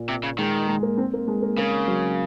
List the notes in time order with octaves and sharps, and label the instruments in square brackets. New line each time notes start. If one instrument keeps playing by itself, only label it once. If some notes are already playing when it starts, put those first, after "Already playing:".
Already playing: [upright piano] A#2
[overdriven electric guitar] C3
C#3
[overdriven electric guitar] D#3 [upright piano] G#3
[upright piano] G#3
A#3
C4
A#3
G#3
A#3
[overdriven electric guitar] C#3 [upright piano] A#3
[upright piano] F#3